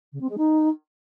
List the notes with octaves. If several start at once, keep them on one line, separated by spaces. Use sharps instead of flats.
C#3
C4
G#3
D#4